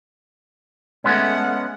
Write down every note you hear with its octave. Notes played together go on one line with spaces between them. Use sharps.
G#3 A3 B3 C#4 F#5